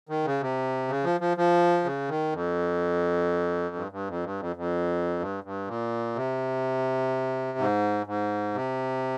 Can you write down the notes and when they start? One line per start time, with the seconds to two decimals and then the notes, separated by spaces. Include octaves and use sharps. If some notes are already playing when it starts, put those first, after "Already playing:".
0.09 D#3
0.25 C#3
0.41 C3
0.88 C#3
1.04 F3
1.21 F3
1.37 F3
1.84 C#3
2.09 D#3
2.33 F2
3.76 G2
3.92 G2
4.08 F2
4.24 G2
4.40 F2
4.56 F2
5.20 G2
5.44 G2
5.67 A#2
6.16 C3
7.58 G#2
8.06 G#2
8.54 C3